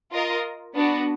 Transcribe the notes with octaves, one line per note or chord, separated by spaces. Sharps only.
F4 A#4 D#5
B3 D4 F#4